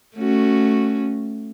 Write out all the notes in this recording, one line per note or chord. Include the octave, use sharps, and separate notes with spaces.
A3 C#4 F#4